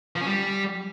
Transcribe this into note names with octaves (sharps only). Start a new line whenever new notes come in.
F3
C#4
G3